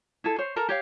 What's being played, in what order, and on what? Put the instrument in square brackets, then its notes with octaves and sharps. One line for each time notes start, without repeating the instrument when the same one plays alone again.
[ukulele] E4 G#4 A4
C5 C#5
A4 A#4 A#5
G4 C#5 F5